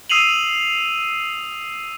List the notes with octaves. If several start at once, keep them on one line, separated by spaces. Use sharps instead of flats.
D#6 E6 C7 D#7 F7 F#7